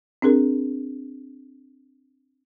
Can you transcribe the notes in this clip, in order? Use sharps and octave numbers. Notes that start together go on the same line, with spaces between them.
C4 D4 G#4 A#4